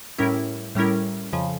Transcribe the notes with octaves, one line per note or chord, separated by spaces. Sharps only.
A2 G3 C#4 E4 A#4
A2 G3 C#4 E4 A#4
F2 C#3 F3